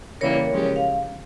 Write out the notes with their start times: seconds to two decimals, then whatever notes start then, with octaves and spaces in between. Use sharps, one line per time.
0.21 C#3 E3 G3 A#3 A#4 C#5
0.51 C#3 F3 G#3 C#4 G4
0.76 F5